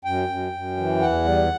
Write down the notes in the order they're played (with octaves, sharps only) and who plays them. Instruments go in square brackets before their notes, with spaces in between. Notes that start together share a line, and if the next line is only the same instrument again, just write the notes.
[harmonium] F#2 G5
F#2
F#2
E3
E2 F#5
G3